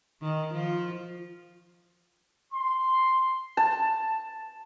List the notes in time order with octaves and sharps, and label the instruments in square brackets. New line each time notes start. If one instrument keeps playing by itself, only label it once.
[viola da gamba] D#3
F3 F4
[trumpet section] C6
[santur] A5